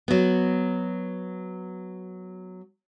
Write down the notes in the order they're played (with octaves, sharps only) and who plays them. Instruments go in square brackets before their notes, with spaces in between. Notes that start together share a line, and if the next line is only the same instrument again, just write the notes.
[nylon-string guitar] F#3 B3